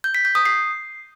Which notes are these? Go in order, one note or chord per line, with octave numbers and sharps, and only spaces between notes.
G6
B6
G6
D#6
C7